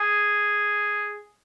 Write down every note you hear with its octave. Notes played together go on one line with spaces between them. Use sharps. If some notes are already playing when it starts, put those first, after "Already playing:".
Already playing: G#4